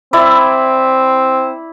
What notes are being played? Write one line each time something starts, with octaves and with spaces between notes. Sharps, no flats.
C4 E4 D5